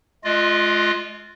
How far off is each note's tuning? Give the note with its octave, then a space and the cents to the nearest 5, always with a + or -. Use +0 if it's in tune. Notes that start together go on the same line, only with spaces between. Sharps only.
G#3 +35 F4 +0 D#5 -30